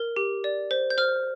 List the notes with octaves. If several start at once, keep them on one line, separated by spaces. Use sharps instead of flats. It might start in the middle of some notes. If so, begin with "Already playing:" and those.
Already playing: A#4
G4
D5
C5
G6
C5 F6